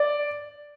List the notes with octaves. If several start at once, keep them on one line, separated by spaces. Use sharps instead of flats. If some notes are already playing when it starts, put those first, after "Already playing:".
Already playing: D5